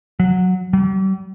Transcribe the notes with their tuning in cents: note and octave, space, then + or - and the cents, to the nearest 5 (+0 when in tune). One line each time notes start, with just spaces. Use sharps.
F#3 -10
G3 -40